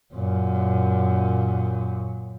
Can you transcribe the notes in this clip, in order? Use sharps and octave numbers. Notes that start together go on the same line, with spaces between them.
F#2 A#2